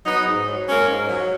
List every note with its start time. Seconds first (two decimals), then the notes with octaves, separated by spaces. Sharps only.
0.05 F#3 B3 D#4
0.26 G#2
0.48 F#3
0.68 G#2 A#3 C#4
0.89 G#2
1.10 F#3